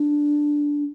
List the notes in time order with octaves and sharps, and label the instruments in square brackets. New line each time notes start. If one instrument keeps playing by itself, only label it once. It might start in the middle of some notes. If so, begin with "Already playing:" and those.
Already playing: [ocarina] D4